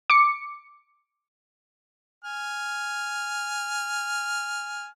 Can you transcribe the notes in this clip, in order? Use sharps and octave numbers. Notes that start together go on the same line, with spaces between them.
D6 C#7
G#5 F6